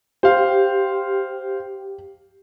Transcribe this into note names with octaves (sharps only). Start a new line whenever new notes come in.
G4 C5 F5